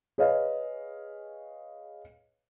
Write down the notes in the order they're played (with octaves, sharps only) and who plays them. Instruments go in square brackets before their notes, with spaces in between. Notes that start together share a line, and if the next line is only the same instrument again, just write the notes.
[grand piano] G#4 B4 C#5 D#5 F5